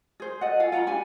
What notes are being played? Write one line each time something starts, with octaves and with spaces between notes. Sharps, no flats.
G#4 C5
A4 D#5 F#5
F4 A4 F5 G#5
F4 F#5 A#5 B5
D4 G4 G#5 B5